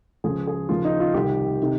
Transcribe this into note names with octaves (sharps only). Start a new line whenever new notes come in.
C#2 C#3 F3 G#4
G#4
D#2 C#3 F3 F4
D#4
F4
C2 C3 D#3 G4
C3 D#3